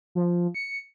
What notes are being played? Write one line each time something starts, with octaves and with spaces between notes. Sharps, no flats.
F3
C#7